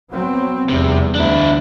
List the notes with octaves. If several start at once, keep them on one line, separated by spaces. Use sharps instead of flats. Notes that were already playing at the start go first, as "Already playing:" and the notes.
F#3 B3 C4
F1 E2 C3 G3
D2 D4 E4